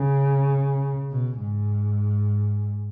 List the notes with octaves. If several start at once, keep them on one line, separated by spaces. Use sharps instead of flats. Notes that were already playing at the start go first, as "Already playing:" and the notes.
Already playing: C#3
B2
G#2